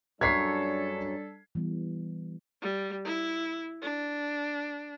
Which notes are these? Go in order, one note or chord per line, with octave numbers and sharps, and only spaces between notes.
F#2 G3 D4 A4 C#5 G#6 B6 C7
E3 G3 B3
G3
E4
D4